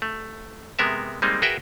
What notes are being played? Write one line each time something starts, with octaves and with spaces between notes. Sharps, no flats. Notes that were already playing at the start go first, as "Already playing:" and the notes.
A3
C3 G#3 B3 A#4 E5
G3 G#3 A#3 C4 D#4
F#4 G#4 A#4 B4 E5 G5